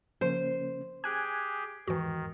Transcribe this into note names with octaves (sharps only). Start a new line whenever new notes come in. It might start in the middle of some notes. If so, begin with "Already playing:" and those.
C#3 F3 A#3 C#4 C5
G4 G#4 G#5 F#6 G#6
E2 G#2 D#3 E3 F#4